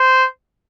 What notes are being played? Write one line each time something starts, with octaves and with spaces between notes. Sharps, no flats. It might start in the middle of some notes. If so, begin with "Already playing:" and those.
Already playing: C5